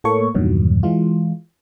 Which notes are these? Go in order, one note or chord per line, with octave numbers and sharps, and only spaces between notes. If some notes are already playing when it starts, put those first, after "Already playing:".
A2 A#3 A4 C#5 C#6
E2 G2 A#2 D#3 F#3
E3 G#3 F4